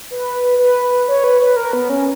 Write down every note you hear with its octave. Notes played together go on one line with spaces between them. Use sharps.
B4
B4
C#5
B4
B4
A#4
B3
C#4